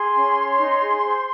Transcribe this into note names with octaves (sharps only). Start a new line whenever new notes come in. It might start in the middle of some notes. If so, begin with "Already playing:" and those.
Already playing: G#4 C6
C#4
C#5
D#4
G#4
C5